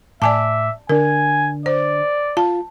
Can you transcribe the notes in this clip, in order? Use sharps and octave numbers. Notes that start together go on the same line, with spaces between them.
A2 D5 E5 G#5 A5 D6
D3 D4 A#4 G#5
C5 D5
F4 A5